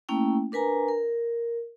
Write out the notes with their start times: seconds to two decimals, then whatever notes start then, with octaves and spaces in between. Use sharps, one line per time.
0.09 A3 A#3 C#4 E4 G5
0.52 D4 A#4 B4 G#5 A#5
0.88 A#4